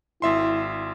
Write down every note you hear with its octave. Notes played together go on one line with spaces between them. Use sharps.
G#1 E4 E5 C6